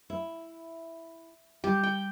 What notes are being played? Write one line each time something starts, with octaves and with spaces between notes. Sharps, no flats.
E4
G3 G4
G5